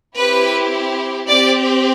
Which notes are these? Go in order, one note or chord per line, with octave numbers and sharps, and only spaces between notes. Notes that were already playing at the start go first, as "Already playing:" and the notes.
C4 E4 G4 B4
C4 G4 D5